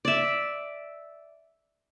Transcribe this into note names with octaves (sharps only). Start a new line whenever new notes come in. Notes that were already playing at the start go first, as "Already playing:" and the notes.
D5 E5